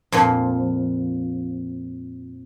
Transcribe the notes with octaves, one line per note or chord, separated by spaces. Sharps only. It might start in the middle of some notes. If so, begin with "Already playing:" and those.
F2 A#2 F3